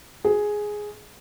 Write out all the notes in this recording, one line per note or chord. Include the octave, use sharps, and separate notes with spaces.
G#4